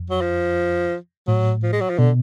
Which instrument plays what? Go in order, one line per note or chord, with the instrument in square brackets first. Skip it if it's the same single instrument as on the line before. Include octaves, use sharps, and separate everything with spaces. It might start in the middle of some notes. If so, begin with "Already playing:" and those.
Already playing: [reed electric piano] F2
[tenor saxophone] F#3
F3
[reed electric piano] A2 [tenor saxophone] F#3
[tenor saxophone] F3
G#3
F#3
F3
[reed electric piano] B2 [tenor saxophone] D3